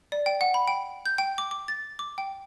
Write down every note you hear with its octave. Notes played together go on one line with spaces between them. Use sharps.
D5
G5
F#5
B5
G5
G6
G5
D6
D6
A6
D6
G5